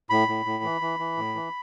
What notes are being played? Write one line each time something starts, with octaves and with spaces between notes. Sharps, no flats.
A2 B5
A2
A2
E3
E3
E3
A2
E3